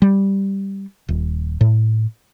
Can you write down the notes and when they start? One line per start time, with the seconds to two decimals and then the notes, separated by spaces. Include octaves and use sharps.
0.02 G3
1.08 D#1
1.61 A2